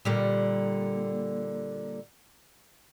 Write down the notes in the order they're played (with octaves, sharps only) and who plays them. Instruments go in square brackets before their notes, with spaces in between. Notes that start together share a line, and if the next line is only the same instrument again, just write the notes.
[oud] A#2 D3 G3